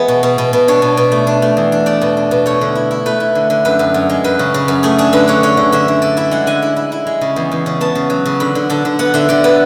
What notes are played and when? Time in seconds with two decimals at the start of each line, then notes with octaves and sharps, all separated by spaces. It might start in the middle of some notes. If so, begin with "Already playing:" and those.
Already playing: E3 G#3 B3 G#4
0.08 B2
0.23 B2
0.38 B2
0.53 B2
0.68 D4 C#5
0.82 B2
0.97 B2
1.12 A3
1.27 D4
1.42 A3
1.57 E2
1.72 D4
1.86 A3 D5
2.01 B2
2.17 D4
2.31 B2
2.46 A3 C#5
2.61 D3
2.75 E4
2.91 E4
3.06 A3 B4
3.20 E4
3.35 D3
3.50 D3
3.65 F#2 B4
3.79 F#2
3.94 F#2
4.09 G#3
4.24 F#2 B4
4.39 C#3
4.54 C#3
4.68 F#2
4.83 A3 G#4
4.98 D4 G#4
5.13 D3 B4
5.28 D3 C#5
5.43 D3 C#5
5.57 D3
5.72 D3 E5
5.88 D3
6.02 D3 D5
6.17 E4 E5
6.31 G#3 F#5
6.47 D3 G#5
6.62 E4
6.76 E4
6.92 E4
7.07 G#3
7.21 C#3
7.36 E2
7.51 E2
7.66 C#3
7.81 B3 A5
7.95 C#3
8.10 F#3
8.25 C#3
8.40 D3 B5
8.55 D3
8.70 D3 A5
8.85 D3
8.99 B3 F#5
9.14 D3 E5
9.29 D3 D5
9.44 B3 B4